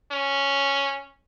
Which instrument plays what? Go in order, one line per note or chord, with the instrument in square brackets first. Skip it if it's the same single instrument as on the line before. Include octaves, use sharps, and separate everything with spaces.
[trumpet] C#4